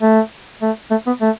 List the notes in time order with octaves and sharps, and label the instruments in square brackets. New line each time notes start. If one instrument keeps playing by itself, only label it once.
[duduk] A3
A3
A3
B3
A3